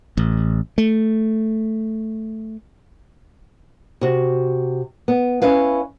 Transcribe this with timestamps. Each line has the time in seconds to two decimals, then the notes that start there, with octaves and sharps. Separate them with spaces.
0.17 A1
0.78 A3
4.01 C3 F#4
5.08 B3
5.42 C#4 E4 B4 F5